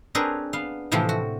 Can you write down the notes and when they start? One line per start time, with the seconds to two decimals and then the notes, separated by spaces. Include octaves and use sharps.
0.15 C4 D4 G#4 A#4 B4 C#5
0.53 B3 F5
0.92 A2 C3 E3 F3 C4
1.09 F#4